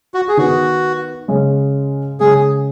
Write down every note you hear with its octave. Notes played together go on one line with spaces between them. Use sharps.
F#4
G#4
D#3 B3 D#4 F#4
C#3 G#3 C#4
C#3 G#3 C#4 G#4